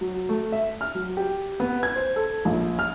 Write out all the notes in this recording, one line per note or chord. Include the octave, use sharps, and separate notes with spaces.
F#3
A3
E5
F6
F#3
G4
B3
G#6
C5
A4
A#1
F6